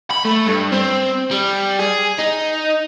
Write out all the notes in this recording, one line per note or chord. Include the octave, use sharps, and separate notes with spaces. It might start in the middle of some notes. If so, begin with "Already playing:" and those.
B5
A3
G2
C4
G3
G#4
D#4